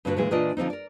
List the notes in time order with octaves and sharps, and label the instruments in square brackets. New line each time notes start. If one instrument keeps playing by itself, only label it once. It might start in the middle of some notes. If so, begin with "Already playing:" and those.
[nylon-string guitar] G2 A#2 D3 F#4 A4 B4
A#2 D#3 E3 G#3 G#4
A#2 E3 D4 F4 D5 D#5
D3 F3 C4 D#4
A#4 D5